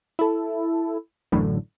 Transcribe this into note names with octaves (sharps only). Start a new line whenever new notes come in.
E4 A4
A1 F#2 A2 D3